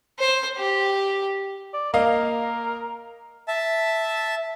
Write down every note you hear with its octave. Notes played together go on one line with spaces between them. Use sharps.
C5
G4
D5
A#3 A#4 D#5 F5
E5 A5